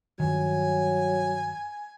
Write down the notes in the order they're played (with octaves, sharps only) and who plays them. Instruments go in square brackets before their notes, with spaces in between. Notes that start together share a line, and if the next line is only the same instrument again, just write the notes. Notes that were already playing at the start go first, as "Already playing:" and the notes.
[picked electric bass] G2 D#3 [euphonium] F#3 [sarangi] G#5